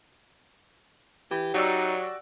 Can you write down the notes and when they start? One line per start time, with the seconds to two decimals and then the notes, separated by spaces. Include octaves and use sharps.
1.31 E3 G4
1.54 F#3 D#4 F#4 D5 E6